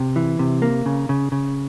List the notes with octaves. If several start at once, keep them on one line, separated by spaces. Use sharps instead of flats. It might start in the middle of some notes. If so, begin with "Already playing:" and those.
Already playing: C3
E3
C3
A#3
C#3
C#3
C#3